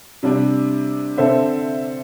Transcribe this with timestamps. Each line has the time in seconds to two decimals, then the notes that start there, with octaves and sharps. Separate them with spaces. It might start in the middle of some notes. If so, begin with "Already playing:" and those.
0.23 C3 G3 D4
1.18 D3 C4 A4 C5 E5